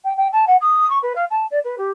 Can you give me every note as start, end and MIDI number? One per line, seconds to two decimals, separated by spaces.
0.04 0.15 79
0.16 0.27 79
0.32 0.44 81
0.47 0.56 78
0.61 0.89 87
0.90 0.98 85
1.02 1.12 71
1.15 1.24 77
1.30 1.46 81
1.50 1.59 74
1.64 1.75 71
1.77 1.90 67